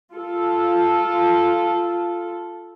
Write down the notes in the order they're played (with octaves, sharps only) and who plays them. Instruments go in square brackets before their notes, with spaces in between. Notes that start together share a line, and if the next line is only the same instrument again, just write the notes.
[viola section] F4 A4